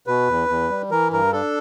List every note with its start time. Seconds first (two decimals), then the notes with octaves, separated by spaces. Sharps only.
0.07 B2 B4
0.28 E2
0.49 E2
0.70 G3
0.90 E3 A#4
1.11 G2 A#4
1.33 D4 A4